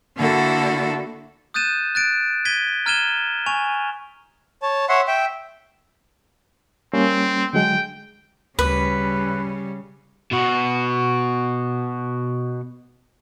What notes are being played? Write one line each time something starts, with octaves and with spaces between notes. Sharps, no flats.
D3 A#3 E4 F#4 A4
D#6 F#6 G6 A6 D#7 E7
F#6 A6 D7
G#6 B6 D#7 G7
A#5 F6 G#6 D#7 E7 G7
G#5 C#6 F7
C#5 A5
C#5 E5 F#5 C6
E5 G5
G3 A#3 C4 C#4
D3 F#3 G#3 G5
D2 C#3 G3 B4 D6
B2 F#4